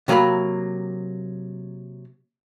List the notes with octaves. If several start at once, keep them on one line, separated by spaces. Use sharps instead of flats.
C3 F#3 A#3 A#5 B5